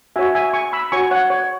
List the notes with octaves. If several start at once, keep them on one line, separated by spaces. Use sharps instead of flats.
F#4 C#5 E5 G#5
E5 G#5
G#5 C#6
B5 E6
F#4 C#5 G#5 C#6
C#5 F#5
C#5